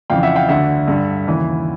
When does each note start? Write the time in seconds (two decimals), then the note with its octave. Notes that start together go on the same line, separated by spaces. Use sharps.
0.10 F2 C#3 E3 F5 G5
0.23 E5 F#5
0.36 F5 G5
0.48 D2 D3 E5 F#5
0.88 G2 D3
1.27 D#2 C#3 E3